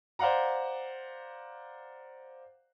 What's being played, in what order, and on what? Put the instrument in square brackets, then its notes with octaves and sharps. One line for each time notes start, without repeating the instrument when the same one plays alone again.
[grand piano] C5 D5 F5 F#5 A#5